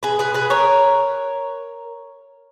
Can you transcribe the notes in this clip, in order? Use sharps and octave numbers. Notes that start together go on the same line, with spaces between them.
G#4 B4
G#4 B4
G#4 B4
A#4 C#5